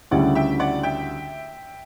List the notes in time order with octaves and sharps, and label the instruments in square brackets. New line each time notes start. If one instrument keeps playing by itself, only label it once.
[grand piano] D2 C#3 G3 C#4 E4 [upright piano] D5 F#5
[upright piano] E5 G5
D5 F#5
E5 G5